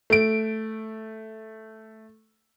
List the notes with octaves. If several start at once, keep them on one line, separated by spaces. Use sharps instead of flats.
A3 D7